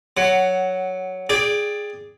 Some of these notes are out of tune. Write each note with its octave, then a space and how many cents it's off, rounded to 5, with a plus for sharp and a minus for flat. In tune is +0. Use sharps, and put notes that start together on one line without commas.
F#3 +5 F#5 +15
G#4 +0 D5 +0 G5 +15